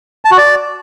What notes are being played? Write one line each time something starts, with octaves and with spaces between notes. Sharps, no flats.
A5
F#4
D5